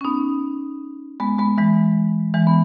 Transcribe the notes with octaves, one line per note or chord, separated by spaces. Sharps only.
C#4
B3 D#4
G#3 B3
G#3 B3
E3 G#3
E3 G#3
B3